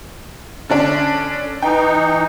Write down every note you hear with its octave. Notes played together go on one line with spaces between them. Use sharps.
D3 C#4 D4
E3 D#4 G5